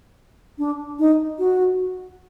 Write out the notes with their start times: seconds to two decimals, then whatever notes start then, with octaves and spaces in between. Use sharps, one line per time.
0.58 D4
0.99 D#4
1.39 F#4